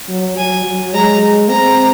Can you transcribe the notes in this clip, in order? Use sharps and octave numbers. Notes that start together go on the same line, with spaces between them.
F#3
F#3 G#5
F#3
G#3 A#5
C4 A#5